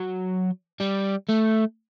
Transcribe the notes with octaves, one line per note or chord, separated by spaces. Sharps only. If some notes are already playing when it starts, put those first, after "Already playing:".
Already playing: F#3
G3
A3